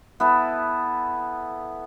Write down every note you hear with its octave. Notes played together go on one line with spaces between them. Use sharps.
B3 E4 A4